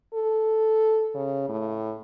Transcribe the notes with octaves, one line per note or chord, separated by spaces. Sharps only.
A4
C#3
A2